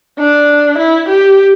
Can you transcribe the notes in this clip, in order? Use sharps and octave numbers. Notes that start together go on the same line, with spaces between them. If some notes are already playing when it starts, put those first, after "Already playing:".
D4
E4
G4